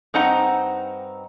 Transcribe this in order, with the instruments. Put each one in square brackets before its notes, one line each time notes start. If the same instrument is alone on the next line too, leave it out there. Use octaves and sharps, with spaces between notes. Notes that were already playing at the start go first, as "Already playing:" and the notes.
[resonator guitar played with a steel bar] G2 C4 D#4 D#5 F#5 A#5